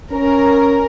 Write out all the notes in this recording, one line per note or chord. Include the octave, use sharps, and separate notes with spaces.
C#4 A#4